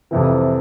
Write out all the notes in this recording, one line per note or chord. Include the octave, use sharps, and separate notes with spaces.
F2 C3 E3